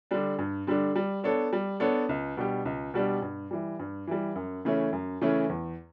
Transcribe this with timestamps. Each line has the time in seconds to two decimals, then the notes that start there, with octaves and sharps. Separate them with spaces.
0.11 D3 G3 D4
0.39 G2
0.67 D3 G3 D4
0.96 G3
1.24 B3 D4 A4 C#5
1.53 G3
1.80 B3 D4 A4 C#5
2.09 C#2
2.37 B2 G3 D4 G4
2.65 C#2
2.94 B2 G3 D4 G4
3.22 G2
3.51 E3 G3
3.79 G2
4.07 E3 G3
4.36 F#2
4.65 C#3 E3 A3 C#4
4.93 F#2
5.22 C#3 E3 A3 C#4
5.50 E2